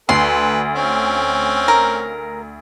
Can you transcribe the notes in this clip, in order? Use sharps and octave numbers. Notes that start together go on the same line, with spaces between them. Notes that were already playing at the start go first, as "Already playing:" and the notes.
D2 A4 B4 C6
C4 C#4
A#4